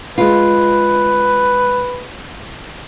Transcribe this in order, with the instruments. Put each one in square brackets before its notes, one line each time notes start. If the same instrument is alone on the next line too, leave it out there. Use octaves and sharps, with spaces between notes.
[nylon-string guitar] G#3 F4 [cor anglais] B4